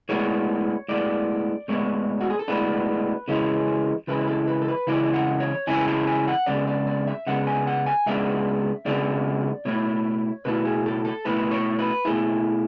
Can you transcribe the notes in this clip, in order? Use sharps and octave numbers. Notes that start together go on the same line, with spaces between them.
A2 G#3 B3 D4 C#5
A2 G#3 B3 D4 D5
A2 G#3 B3 D4 C#5
F#4
G#4
A4
A2 G#3 B3 D4 B4
C#3 E3 G#3 C#4 E4
C#3 E3 G#3 C#4 E4 B4
B4
A4
B4
A4
B4
C#3 E3 G#3 C#4 E4 D5
F#5
C#5
C#3 E3 G#3 C#4 E4 G#5
A5
G#5
F#5
C#2 C#3 G#3 B3 D4 D5
D5
D5
E5
C#2 C#3 G#3 B3 D4 F#5
G#5
F#5
G#5
C#2 C#3 G#3 B3 D4 E5
C#2 C#3 G#3 B3 D4 D5
B2 A3 E4 C#5
B2 A3 E4 B4
G#4
A4
A4
B2 A3 E4 B4
C#5
B4
B2 A3 E4 G#4